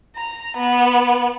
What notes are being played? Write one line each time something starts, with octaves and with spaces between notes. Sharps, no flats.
A#5
B3